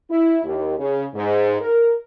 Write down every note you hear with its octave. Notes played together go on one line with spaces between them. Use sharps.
E4
D#2
C#3
G#2
A#4